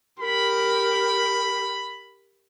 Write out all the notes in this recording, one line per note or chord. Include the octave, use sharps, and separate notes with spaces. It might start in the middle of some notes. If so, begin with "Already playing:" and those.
G4 A#4 B5